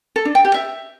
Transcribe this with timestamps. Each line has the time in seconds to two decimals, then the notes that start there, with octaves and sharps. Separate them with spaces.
0.16 A4
0.25 D4
0.35 G5
0.45 G4
0.54 E5